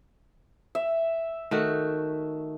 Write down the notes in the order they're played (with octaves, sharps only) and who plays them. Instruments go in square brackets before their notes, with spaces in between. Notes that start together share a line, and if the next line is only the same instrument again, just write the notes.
[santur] E5
[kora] D#3 A3 F#4